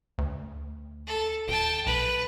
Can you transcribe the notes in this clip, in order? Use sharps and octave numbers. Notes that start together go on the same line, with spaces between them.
D2
A4
D#1 G5 A5
B1 B4